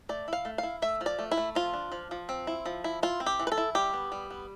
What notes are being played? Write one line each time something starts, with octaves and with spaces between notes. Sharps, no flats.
A3 D5
E4 F5
A3
E4 F5
A3 E5
F3
D5
A3
E4
A3
F3 F4
D4
F3
F3
C4
E4
F3
E4
E4 F4
C4
G4
E3
B4
A4
E4
G3 G4
B3
G3
B3